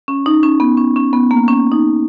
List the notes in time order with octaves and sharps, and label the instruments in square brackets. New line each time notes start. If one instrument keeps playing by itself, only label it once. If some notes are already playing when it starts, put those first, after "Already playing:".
[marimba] C#4
D#4
C#4
B3
C#4
C#4
B3
A#3
C#4
D#4